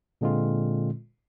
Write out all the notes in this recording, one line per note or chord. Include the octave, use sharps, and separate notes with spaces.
A#2 D3 G#3 C4 F4